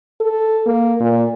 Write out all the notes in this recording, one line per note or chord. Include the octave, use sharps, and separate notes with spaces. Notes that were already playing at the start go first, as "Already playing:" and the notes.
A4
A#3
A#2